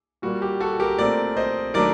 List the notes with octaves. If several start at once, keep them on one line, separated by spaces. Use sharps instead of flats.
A#2 G3 A#3 F#4
G4
F#4 A4
G4 A#4
A#2 A3 C4 A#4 D5
C5 D#5
D#3 F#3 A3 D4 A#4 D5